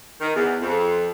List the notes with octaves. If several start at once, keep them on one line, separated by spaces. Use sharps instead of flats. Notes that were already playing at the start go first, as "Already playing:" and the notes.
D#3
E2
F2